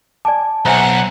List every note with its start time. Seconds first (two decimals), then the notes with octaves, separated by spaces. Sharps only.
0.25 D5 G#5 A5 D6
0.65 B1 C5 E5 F#5 G#5 A#5